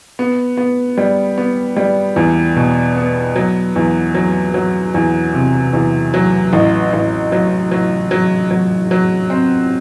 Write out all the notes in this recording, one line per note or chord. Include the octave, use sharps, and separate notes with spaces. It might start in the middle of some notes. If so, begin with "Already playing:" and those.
B3
B3
G3
B3
G3
E2
B2
B3
F#3
E2
F#3
F#3
E2
C3
E2
F#3
A1
A1
F#3
F#3
F#3
F#3
F#3
C4